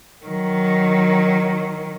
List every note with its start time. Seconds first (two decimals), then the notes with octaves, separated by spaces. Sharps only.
0.25 D#3 F#3